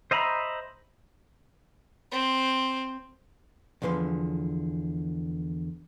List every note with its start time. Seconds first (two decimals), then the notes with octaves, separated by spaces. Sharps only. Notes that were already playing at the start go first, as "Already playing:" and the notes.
0.11 C5 D#5 E5 A#5 B5
2.11 C4
3.82 E2 D3 F3 B4 C6